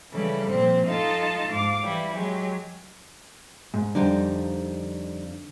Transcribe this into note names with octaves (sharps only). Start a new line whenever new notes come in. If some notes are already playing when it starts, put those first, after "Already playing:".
C#3 E3 G3 E4 A4
A#2 F3 C4
D#4 F4 A4 D#5 A5
G#2 F5 D6
E3 G3 E4
F#3 G#3 G4
G#2
F2 D3 G3 D#4